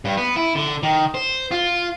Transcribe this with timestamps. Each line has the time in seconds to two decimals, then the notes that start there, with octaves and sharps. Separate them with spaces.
0.05 G2
0.17 B3
0.36 E4
0.55 D3
0.83 D#3
1.14 C5
1.51 F4